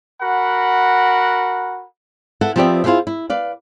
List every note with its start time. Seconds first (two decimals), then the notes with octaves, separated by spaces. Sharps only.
0.22 F#4 A#4 F#5 B5
2.41 E4 A4 B4 F#5
2.56 F3 B3 C4 G4 D5 E5
2.84 E4 F4 G4 G#4 C5 E5
3.07 E4
3.30 B4 D5 F5